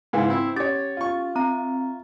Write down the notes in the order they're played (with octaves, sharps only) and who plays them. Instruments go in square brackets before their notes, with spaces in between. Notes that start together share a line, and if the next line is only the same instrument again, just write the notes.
[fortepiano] G#2 C#3 E3
C4 E4
[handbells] C#4 G4 A6 [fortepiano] C#5 D6
[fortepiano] F4 C#6
[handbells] C4 E5 A#5